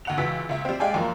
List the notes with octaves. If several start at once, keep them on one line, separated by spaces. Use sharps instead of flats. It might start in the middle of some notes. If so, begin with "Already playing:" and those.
D2 F#5 F7
C#2 E3 F#4 E6 A6 B6
C#2 E5
G3 C4
G#3 G4 D5 F5 G5 G#5
F#2 F3 A#3